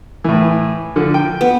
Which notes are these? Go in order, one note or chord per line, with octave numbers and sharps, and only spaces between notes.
A2 E3
D3 F3
G5
B3